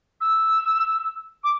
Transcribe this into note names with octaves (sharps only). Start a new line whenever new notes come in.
E6
D6